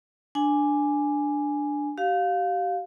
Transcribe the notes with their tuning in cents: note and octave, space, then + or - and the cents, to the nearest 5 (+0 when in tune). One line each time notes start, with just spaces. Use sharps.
D4 +0 G#5 +0
G4 -35 F5 +15